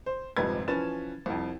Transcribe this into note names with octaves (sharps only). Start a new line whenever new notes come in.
C5
D#1 F2 G#2 C3 B4 G#6
E3 F3 C#4 B4 A6 E7
C2 F2